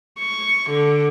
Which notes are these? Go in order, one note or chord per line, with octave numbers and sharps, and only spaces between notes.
C#6
D3